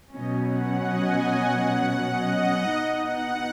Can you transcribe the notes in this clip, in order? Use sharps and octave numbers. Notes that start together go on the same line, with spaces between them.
B2 F#3 C#4 D#5
F#5
D#5 G#5
D#5 G#5
F#5
D#5
F#5
B2 B3 D#4 D#5
F#5